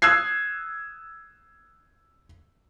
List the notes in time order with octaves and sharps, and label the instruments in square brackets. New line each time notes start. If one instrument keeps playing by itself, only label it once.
[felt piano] D#6 E6 F#6 G#6 C7